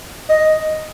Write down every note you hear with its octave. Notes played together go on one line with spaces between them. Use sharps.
D#5